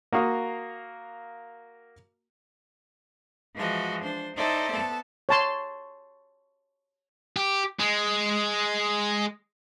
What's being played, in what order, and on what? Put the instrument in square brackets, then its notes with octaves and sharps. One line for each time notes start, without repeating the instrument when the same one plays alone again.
[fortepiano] A#3 F#4 F5 D#6
[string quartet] E3 F3 G#3 F#4 D#5
D4 C5
D#4 E4 A4 C5 D5 D#5
B3 A4 A5
[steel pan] C#5 A5 C6
[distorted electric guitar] G4
G#3